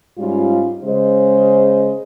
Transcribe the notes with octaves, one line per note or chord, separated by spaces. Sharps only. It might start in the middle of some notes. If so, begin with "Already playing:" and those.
G#2 G3 C#4 F4
C#3 G#3 G#4 C5 D#5